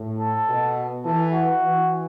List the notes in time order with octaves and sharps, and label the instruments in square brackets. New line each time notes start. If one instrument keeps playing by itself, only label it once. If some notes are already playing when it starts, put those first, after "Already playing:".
Already playing: [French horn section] A2
[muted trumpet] A4
[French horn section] B2
[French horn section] E3 [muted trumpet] A4
[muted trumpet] F#4
[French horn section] E3